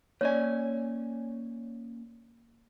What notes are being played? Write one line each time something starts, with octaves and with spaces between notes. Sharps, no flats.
A#3 C#4 C#5 D5 G#5